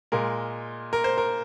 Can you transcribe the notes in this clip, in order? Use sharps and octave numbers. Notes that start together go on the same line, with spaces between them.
A#2 G#3 A#4
A#4
C5
A#4